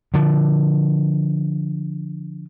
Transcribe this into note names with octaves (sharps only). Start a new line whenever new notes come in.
D3 F3